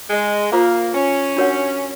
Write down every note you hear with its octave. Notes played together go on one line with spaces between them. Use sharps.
G#3
A#3 F4 A4 C5 F5 A#5
C#4
D4 F#4 A#4 C#5 F#5